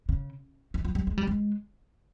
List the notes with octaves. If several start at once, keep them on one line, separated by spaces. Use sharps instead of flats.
C#3
D#3
F3
G3
G#3
G3
G#3